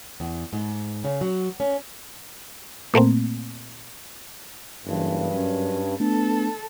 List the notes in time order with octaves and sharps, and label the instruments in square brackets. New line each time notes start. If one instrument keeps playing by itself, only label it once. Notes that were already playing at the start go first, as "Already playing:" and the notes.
[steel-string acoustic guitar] E2
G#2
C#3
F#3
C#4
[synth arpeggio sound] A#2 A3 A#3 C4
[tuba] F#1 [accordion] G2 [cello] E3
[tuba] F#2 [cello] C#4
[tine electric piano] A3 D4 [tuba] B3 [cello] A4